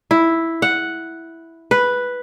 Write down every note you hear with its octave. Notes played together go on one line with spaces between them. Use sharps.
E4
F#5
B4